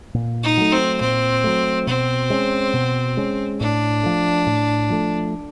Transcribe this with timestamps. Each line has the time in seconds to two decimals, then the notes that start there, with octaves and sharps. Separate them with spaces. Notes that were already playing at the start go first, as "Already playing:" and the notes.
0.14 A#2
0.43 D#4
0.57 F#3 A3
0.72 C4
1.01 A#2 C4
1.44 F#3 A3
1.87 B2 C4
2.30 G#3 C#4
2.74 B2
3.17 G#3 C#4
3.60 A2 D4
4.03 F3 A3
4.47 A2
4.90 F3 A3